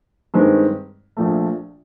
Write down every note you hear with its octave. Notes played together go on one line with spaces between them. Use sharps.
G2 D#3 G#3 C4
A#1 A#2 F3 A3